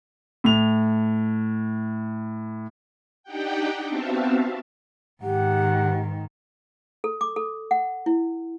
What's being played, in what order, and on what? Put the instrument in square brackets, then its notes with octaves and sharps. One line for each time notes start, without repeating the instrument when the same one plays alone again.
[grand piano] A2 F7
[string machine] D4 D#4 G4 F#5 G5
B3 C4 F#4 E5 F5 A5
[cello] G#2 D#3 [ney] G4 [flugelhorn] F#5
[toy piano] A4
D6
A4
F#5
E4